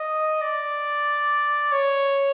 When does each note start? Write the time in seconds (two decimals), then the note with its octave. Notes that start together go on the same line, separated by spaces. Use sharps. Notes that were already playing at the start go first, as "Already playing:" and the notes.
Already playing: D#5
0.41 D5
1.72 C#5